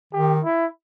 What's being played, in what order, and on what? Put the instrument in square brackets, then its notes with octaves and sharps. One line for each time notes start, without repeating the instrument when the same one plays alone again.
[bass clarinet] D#3 [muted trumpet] G4
[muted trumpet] E4